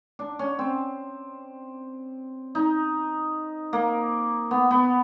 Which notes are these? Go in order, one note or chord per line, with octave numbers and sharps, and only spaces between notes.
D4
C#4
C4
D#4
A#3
B3
B3